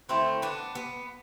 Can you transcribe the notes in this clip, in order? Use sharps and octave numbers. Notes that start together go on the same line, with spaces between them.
D3 A3 C4 E4
B3 D4
B3